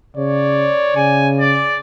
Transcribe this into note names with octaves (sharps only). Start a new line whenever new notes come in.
C#3 C#5 D5
C#3 G#5
D5